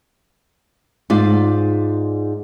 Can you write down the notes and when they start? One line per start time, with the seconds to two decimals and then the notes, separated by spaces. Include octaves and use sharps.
1.10 G#2 F4 D5